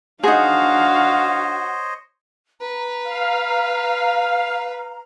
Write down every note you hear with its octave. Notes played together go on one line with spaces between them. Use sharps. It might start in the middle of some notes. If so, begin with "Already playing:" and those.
D4 D#4 F#4 G#4 C5 C#5 D#5 F5
B4 A#5
F5